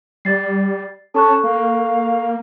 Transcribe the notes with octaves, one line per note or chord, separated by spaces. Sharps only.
G3 D5 A6 C7
C#4 A4 A5 C#6 F#6
A#3 F5